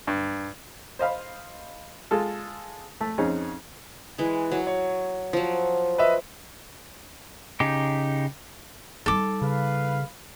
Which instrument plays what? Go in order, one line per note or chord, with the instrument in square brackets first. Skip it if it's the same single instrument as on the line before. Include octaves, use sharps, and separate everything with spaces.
[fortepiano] G2
C5 D#5 F5 B5
G#3 F4 A4
A3
F2 C4 C#4 D#4 G#4
[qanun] E3 G#3
F#3
[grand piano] C#5
[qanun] F3 F#3
[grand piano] B4 D#5 E5
[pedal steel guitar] C#3 D#4 G4
[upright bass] G3 D#4 [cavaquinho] A4 D6
[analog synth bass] C#3 [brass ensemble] B4 F5